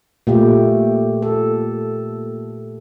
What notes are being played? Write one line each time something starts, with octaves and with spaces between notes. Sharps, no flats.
A#2 A3 G4
A4